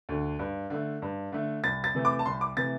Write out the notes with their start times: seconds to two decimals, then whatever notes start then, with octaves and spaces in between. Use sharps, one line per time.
0.09 D2 D3
0.39 G2
0.70 D3 A3
1.02 G2
1.32 D3 A3
1.64 C2 A6
1.84 A6
1.95 C3 E3 A3
2.05 D6
2.19 A5
2.26 C2 C6
2.41 D6
2.57 C3 E3 A3 A6